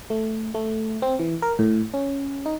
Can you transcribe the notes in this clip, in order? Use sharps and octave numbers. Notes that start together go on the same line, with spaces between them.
A3
A3
C4
E3
A#4
A2
C#4
D#4